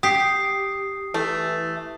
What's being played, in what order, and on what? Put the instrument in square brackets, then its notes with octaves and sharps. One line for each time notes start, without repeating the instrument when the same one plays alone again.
[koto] G4 [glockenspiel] D#6 B6 C7
[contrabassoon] E3 [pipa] A3